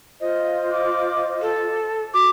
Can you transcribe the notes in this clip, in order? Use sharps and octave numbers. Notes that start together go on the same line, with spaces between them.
F4 C5 D#5
D6
A4
F#4 D6